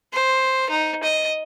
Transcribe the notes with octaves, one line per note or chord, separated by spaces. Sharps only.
C5
D#4
D#5